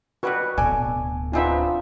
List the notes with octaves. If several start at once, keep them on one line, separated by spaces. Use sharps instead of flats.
B2 G3 F#4 B4 C#6
D1 B2 A4 D5 G#5
B3 C4 D4 D#4 F4 G#4 E5